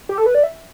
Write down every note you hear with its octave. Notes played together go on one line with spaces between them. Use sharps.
G4
A4
B4
D5
E5